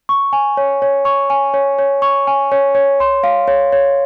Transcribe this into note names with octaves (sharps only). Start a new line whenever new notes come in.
C#6
G#5
C#5
C#5
C#6
G#5
C#5
C#5
C#6
G#5
C#5
C#5
C6
F5
C#5
C#5